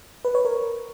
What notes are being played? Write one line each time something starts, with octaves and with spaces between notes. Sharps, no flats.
B4
C#5
A#4